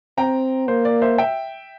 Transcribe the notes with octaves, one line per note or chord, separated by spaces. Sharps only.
C4 G5 A#5
A#3 C5
D5
C5 E5
E5 G5